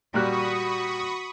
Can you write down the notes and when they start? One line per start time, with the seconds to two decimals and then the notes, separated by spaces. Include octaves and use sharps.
0.14 A#2 G3 F#4 B5 C#6 D#6 F#6